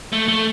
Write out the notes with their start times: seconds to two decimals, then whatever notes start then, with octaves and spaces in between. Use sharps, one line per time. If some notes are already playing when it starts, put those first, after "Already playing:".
0.13 A3
0.28 A3